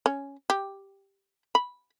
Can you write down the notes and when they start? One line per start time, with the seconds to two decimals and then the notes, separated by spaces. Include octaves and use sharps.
0.06 C#4
0.50 G4
1.55 B5